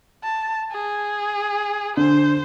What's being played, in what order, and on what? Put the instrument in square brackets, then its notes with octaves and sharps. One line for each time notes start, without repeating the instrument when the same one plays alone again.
[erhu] A5
G#4
[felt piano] D3 [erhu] C5